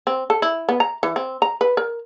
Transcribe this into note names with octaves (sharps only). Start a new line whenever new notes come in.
C4
A4
E4
B3
A#5
E3
C4
A#5
B4
A#4